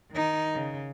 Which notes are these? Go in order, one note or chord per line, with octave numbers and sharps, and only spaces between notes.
D#3 D#4
C#3